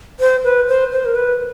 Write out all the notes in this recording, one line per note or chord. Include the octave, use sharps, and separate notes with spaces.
C5
B4
C5
C5
A#4
B4